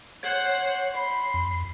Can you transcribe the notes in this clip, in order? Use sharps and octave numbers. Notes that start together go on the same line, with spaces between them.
C5 C#5 F#5
B5 C6
F2